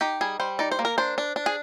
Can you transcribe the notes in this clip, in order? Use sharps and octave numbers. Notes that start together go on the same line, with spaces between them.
D#4 G4
G3 G#4
G3 C5
D#4 D5
C5
A#3
A#4
D4 C5
D4
D4
G#4